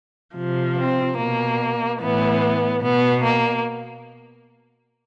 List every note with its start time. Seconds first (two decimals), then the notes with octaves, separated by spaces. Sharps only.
0.35 C3 F3
0.77 C4
1.17 B2 A#3
2.01 A2 E3 B3
2.82 B2 B3
3.24 A#3